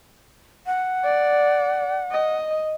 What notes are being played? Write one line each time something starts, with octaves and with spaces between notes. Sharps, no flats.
F#5
D5
D#5